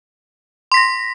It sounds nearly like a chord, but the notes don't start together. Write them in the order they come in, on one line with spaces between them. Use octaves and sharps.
C6 B6 A#6